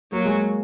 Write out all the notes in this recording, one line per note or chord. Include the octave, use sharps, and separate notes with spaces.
F#3 A#3
G#3
A#3